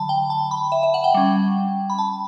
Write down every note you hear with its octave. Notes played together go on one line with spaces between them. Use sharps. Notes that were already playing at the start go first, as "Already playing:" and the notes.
Already playing: D3 F#3 A5 B5
G5
A5
B5
E5
E5
F#5
G5
G3 C#4
B5
A5